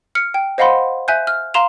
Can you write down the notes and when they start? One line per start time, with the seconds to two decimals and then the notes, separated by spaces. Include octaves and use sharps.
0.15 F6 C#7
0.34 G5
0.58 C5 D#5 F5 F#5 B5 C6
1.08 E5 G#5 F#6 G6
1.27 F6
1.54 F5 A#5 C6 E7 F7